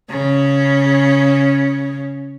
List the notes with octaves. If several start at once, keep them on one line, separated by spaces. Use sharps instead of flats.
C#3 C#4